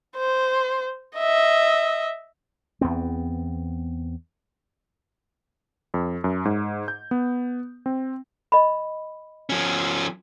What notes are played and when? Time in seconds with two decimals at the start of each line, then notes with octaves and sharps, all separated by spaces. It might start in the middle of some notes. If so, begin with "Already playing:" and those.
0.17 C5
1.18 D#5 E5
2.81 E2 B3 C4
5.94 F2
6.24 F#2
6.45 G#2
6.88 G6
7.11 B3
7.86 C4
8.52 D#5 B5
9.50 F3 C#4